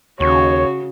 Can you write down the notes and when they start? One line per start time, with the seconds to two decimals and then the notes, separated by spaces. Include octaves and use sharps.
0.20 D#2 C#3 F#4 C#5